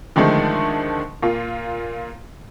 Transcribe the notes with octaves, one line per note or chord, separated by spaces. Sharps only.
D3 D#3 F3 G#3 A3 D4
A#2 F4